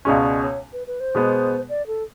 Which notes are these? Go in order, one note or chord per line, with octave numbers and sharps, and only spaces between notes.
C#2 B2 G#3 C#4 D5
D5
C#5
B4
B4
C5
B2 G#3 B3
D5
A4